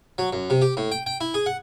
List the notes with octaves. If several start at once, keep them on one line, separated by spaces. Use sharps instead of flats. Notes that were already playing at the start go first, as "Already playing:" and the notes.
F#3
F#2
C3
G4
A2
G5
G5
E4
G#4
F#5